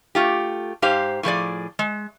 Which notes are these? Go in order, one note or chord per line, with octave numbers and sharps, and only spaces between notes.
A3 F4 G4
G#2 G4 C5 F5
A2 F3 G#4 D5
G#3